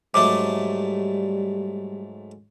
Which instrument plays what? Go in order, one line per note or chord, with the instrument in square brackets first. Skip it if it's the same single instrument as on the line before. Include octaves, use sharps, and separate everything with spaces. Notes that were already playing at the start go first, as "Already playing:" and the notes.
[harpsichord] G#2 F#3 A3 [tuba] G3 [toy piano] D6